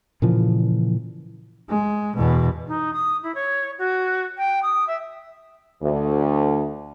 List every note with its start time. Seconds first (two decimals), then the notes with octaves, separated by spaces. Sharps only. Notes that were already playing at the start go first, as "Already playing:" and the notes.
0.22 A#2 C#3 E3 F3
1.69 G#3
2.16 E2 B2
2.67 D#4
2.93 D#6
3.23 E4
3.34 C#5
3.78 F#4
4.37 G5
4.62 D#6
4.87 E5
5.81 D2